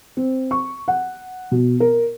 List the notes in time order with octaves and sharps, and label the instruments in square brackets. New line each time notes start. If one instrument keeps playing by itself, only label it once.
[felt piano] C4
C#6
F#5
B2
A#4